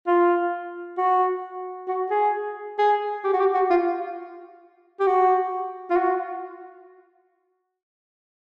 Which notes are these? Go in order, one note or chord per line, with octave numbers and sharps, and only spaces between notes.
F4
F#4
F#4
G#4
G#4
G4
F#4
G4
F#4
F4
G4
F#4
F4
F#4